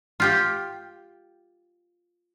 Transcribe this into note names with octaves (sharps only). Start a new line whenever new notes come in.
F4 G4 G5